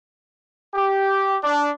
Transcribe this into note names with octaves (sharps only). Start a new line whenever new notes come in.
G4
D4